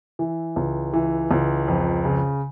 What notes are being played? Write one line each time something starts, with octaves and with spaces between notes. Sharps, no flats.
E3
C#2
E3
C#2
F2
C#3